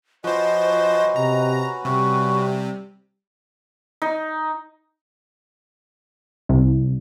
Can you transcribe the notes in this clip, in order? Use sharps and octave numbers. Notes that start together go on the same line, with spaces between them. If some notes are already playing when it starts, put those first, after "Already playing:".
F3 C#4 F#4 B4 C5 D#5
C3 A#5
C3 G3 C#6
D#4
C2